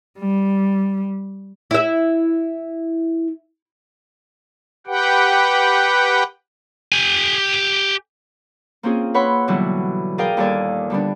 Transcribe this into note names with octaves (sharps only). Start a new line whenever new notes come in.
G3
E4 E5
G4 B4 F#5 G5
G4 G#5
A#3 C4 C#4 F4 G#4
B4 C#5 F#5 B5 C6 E6
B2 D3 E3 F#3 G3 E4
G#4 A#4 D5 D#5 F5 G5
D#2 A#2 G3 A4 D5 G#5
D3 G3 B3 D4